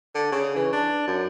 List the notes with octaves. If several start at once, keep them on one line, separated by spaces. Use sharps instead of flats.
D3
C#3
E3
D4
F#2